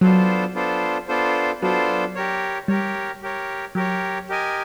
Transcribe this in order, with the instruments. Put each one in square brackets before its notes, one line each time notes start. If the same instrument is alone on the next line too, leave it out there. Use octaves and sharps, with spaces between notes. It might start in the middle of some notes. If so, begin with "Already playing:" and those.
[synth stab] F#3 [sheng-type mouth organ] B3 D4 F4 A4 C5
[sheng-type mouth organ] B3 D4 F4 A4 C5
B3 D4 F4 A4 C5
[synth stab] F#3 [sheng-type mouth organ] B3 D4 F4 A4 C5
[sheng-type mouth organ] G4 A#4 C#5
[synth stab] G3 [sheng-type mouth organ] G4 A#4 C#5
[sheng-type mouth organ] G4 A#4 C#5
[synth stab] F#3 [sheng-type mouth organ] G4 A#4 C#5
[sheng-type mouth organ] G4 A#4 D#5 G#5